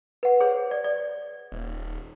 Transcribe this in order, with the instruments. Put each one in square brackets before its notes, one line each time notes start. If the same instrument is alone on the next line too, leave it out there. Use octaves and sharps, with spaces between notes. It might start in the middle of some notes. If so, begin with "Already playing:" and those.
[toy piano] B4 F#5
G#4 C5 C#5
D5
D5
[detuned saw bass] D#1